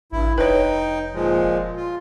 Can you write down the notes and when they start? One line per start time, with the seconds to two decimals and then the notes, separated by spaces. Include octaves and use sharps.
0.12 A1 G2 E4
0.38 F1 D#4 B4 C#5 G5
1.14 A#2 F3 G#3
1.76 F4